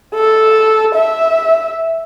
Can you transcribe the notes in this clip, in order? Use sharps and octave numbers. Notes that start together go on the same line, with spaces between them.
A4
E5